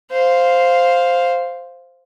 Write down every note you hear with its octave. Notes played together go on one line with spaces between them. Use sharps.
C5 F5